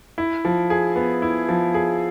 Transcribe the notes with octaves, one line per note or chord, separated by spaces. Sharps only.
E4
F3
G#4
B3
E4
F3
G#4